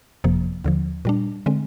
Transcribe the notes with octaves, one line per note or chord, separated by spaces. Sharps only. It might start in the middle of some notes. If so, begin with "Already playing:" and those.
G1 F2 C3 F3 A#3
D#2 D3 F3
A#2 G3 D4
D3 G#3 C4